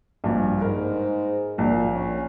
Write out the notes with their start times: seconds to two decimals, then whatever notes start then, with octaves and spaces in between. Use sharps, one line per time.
0.24 A#1 G2
0.61 G#2 A#4
1.58 A#1 A#2
1.93 C#4